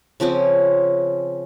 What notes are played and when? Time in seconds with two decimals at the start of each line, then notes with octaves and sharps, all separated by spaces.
0.20 C#3 F3 C4 C#4